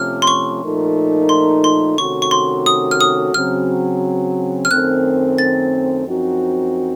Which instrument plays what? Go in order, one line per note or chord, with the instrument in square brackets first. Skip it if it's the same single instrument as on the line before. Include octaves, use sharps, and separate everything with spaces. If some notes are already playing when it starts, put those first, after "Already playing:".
Already playing: [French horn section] C3 F3 A3 C#4 [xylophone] F6
[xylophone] C6
C#6
[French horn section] A#2 F3 A3 D#4 A#4
[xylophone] C6
C6
[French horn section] C3 D#3 A3 C#4 F#4 [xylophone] C#6
[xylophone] C#6
C6
D#6
F6
D#6
[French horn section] C#3 F#3 C4 [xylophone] F6
[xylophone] F6
[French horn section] F#2 D#3 A3 C4 [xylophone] F#6
[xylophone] A6
[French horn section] F#2 F3 C4 D#4 F#4